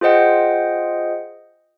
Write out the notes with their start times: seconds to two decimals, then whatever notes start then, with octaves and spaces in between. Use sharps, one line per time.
0.01 F4 G#4 C5 D#5 F#5 G5